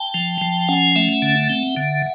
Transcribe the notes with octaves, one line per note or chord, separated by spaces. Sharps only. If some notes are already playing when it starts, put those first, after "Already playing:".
Already playing: G5 A5
F3
F3
C#4 F#5 G#5
A3 E5 F#5
D3
C4
D3